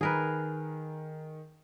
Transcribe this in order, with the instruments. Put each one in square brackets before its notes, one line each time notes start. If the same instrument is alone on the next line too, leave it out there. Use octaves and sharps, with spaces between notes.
[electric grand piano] D#3 [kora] G#4 A#4 B4